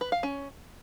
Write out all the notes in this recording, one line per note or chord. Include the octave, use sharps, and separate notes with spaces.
B4
F5
C#4